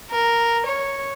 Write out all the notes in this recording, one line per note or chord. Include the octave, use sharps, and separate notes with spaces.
A#4
C#5